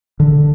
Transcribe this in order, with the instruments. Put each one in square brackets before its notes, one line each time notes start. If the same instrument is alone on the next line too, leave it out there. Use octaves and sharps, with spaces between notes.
[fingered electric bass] D3